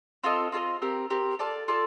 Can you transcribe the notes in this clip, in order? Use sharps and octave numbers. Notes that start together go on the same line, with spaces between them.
C4 F4 A4 D#5
C4 F4 A4 D#5
C4 G4 A#4
C4 G4 A#4
F4 A4 D5 A5
F4 A4 D5 A5